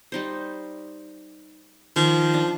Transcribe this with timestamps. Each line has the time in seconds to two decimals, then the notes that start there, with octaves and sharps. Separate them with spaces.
0.12 G3 D#4 C5
1.96 D#3 F3
2.34 D4